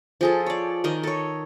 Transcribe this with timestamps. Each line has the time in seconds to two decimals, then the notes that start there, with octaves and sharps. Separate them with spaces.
0.21 F3 G#4 A4
0.46 C#5 D5
0.84 D#3 A#4 D#5
1.03 A4 C#5